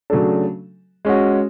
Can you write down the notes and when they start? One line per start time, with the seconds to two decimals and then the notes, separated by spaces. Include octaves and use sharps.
0.10 C#3 F#3 A3 D4 A4
1.05 G#3 C#4 F#4